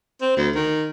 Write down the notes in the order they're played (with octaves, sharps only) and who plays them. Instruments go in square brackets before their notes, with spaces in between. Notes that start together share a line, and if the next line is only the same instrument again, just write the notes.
[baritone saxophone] C4
D2
D#3